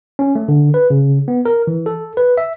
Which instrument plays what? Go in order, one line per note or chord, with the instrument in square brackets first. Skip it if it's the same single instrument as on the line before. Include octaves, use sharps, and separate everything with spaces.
[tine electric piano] C#4
A3
D3
B4
C#3
B3
A#4
E3
A4
B4
E5